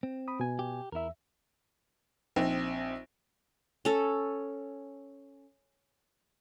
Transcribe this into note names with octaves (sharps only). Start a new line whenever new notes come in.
C4
B5 D#6
B2 G#5
G4
E2 E4 A#4 E5
A#1 C4 D#4
C#4 A4